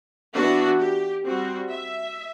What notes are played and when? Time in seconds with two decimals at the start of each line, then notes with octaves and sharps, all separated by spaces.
0.35 E3 B3 D4 F#4
0.80 G4
1.24 G3 C4 F#4
1.70 E5